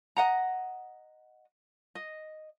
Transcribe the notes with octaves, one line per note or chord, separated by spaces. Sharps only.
D#5 F#5 A#5
D#5